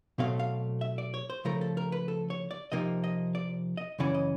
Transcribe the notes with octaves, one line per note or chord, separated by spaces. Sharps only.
B2 F#3 A3 C4 F5
F5
E5
D5
C#5
C5
C#3 F3 A3 A#4
A4
A#4
B4
A4
C#5
D5
C3 F3 A#3 D#4 D#5
D#5
D5
D#5
F#2 C#3 E3 C#4 D5
D#5